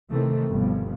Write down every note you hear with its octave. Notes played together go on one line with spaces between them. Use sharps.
C3 D#3 E3 A3 C4
G1 G2 B2 F3